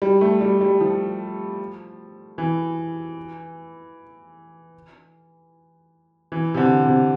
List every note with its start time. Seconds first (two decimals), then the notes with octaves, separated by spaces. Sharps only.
0.02 G3
0.21 A3
0.41 G3
0.61 G3
0.80 F3
2.38 E3
6.32 E3
6.54 C3
6.57 D3
6.85 C3